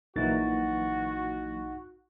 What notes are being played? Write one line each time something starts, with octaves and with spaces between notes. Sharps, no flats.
A#1 A#2 E3 F#3 D#4 F#4 A6